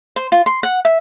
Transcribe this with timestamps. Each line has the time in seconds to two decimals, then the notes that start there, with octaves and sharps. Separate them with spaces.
0.16 C5
0.32 F4
0.46 C6
0.63 F#5
0.85 E5